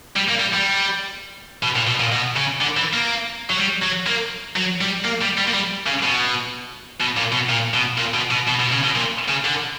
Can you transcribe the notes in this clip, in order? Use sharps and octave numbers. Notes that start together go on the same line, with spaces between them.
G3
A#3
G3
G3
B2
A#2
B2
A#2
B2
C#3
D3
E3
A#3
F#3
G3
F#3
A#3
F#3
G3
A#3
G3
G3
A#3
G3
C#3
B2
B2
A#2
B2
A#2
B2
A#2
B2
B2
B2
B2
C#3
B2
A#2
C#3
D3